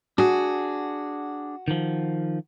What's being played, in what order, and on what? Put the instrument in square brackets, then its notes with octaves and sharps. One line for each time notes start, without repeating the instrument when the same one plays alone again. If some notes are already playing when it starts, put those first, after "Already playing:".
[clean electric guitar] D4 G#4 [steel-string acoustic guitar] F#4
[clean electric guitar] D#3 F3